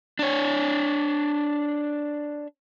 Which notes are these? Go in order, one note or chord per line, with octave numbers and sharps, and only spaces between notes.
D4 C#5